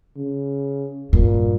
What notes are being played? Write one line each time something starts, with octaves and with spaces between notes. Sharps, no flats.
C#3
G2 A#2